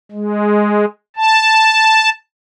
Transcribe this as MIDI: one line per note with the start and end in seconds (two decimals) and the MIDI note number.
0.12 0.85 56
1.17 2.10 81